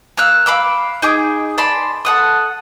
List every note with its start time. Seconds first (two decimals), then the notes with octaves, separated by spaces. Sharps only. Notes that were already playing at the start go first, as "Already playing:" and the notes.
0.17 A#3 F5 E6 F#6
0.46 F5 B5 D6 E6
1.02 D#4 G#4 D6
1.58 D5 A5 B5 C6
2.05 A4 F#5 D#6